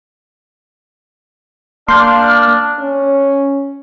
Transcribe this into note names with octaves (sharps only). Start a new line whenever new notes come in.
A#3 D4 C6 F6 G6
C#4